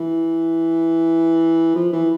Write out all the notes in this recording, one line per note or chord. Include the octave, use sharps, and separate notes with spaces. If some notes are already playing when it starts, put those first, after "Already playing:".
Already playing: E3
F3
E3